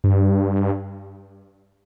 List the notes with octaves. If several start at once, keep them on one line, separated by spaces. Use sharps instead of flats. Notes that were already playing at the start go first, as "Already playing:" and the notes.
G2